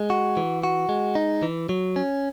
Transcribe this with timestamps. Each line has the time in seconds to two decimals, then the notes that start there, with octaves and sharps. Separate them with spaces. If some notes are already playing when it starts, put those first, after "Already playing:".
Already playing: G#3
0.10 F#4
0.37 E3
0.64 F#4
0.89 G#3
1.15 D#4
1.43 E3
1.69 F#3
1.96 C#4